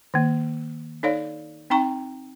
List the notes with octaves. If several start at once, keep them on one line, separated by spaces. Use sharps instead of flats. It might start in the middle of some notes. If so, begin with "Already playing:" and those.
D#3 A#3
D#4 A4 C#5 D5 F5
C4 D#4 G5 A#5 C#6